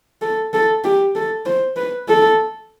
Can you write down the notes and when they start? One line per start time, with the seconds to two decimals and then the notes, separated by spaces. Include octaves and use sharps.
0.22 A4
0.54 A4
0.84 G4
1.16 A4
1.46 C5
1.76 B4
2.08 A4